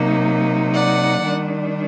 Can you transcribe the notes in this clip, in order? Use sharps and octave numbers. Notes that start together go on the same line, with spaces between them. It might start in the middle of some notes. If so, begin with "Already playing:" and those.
Already playing: C3 F#3 A#3 D#4
D5 F#5
D#3 G3 D4